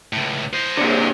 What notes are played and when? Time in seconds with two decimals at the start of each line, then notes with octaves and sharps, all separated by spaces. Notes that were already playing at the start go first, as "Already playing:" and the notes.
0.13 C#2 A2
0.54 C5 D#5
0.77 A#2 D3